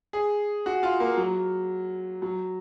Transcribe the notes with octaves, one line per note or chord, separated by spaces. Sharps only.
G#4
F#4
F4
A#3
F#3
F#3